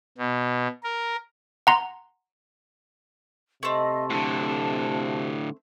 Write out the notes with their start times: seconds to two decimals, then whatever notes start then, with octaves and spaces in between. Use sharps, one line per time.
0.18 B2
0.84 A#4
1.67 F#5 A#5 C6
3.63 C3 A3 C4 D#5
4.10 A2 D3 A5